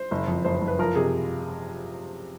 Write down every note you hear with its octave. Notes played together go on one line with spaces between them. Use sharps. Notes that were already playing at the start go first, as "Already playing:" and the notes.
Already playing: C5
F#1
F2
F#1 C5
F#1 C5
B4
F3 A#4
C3 G#4